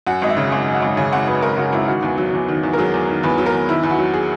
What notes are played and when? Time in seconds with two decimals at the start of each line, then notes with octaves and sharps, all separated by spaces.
0.07 F#2 F#5
0.22 G#1 D#5
0.30 E5
0.37 C#3
0.52 G#1
0.67 F#2
0.75 F#5
0.82 G#1
0.97 C#3 G#5
1.13 G#1 F#5
1.27 F#2 B4
1.42 G#1 A#4
1.57 C#3 F#4
1.73 G#1 E4
1.88 D#3 F#4
2.03 E2
2.17 F#3
2.33 E2
2.48 D#3
2.63 E2
2.73 A#4
2.78 F#3 G#4
2.94 E2
3.08 D#3
3.23 E2 B4
3.38 F#3
3.46 A#4
3.53 E2
3.68 D#3 E4
3.83 E2 E4
3.91 F#4
3.99 F#3
4.14 G#4